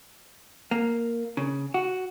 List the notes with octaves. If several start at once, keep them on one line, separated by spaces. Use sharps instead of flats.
A#3
C#3
F#4